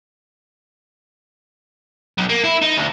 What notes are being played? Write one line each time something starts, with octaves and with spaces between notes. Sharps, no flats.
B1
A#3
E4
D#4
D2